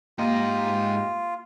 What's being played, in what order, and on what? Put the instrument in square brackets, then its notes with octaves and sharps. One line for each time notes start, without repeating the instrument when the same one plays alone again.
[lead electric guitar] G#2 D#5 [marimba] A#3 [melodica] F4 [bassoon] G4